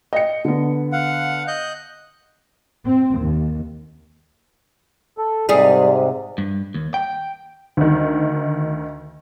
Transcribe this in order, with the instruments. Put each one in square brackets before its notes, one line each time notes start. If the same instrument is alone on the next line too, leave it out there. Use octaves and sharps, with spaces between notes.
[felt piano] D#5 G5 C#7
D3 B3
[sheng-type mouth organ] F5 F#5
D#5 F#6 G6
[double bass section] C4
D#2
[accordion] A4
[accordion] G#2 C3 [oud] G3 G#4
[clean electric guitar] G2
D#2
G5
[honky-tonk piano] D2 D#3